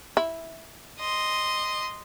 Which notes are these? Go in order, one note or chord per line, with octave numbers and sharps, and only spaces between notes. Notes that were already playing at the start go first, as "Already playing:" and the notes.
E4
D#5 C6